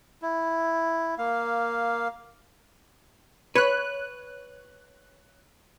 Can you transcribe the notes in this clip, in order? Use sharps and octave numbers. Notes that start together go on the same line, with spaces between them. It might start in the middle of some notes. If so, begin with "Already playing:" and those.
E4
A#3 F5
B4 C#5 F#6